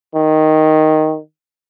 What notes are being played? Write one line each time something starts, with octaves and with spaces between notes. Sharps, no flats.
D#3